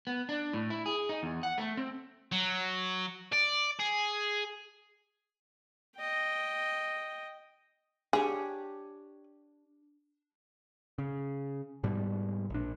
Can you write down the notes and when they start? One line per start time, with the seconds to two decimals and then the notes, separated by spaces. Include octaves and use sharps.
0.07 B3
0.29 D4
0.53 A2
0.70 E4
0.86 G#4
1.09 D#4
1.23 E2
1.43 F#5
1.58 A3
1.77 C4
2.32 F#3
3.33 D5
3.80 G#4
5.97 D#5 G5
8.13 D4 G4 G#4 C#5
10.98 C#3
11.83 G#2 B2 G3
12.50 A#1 D4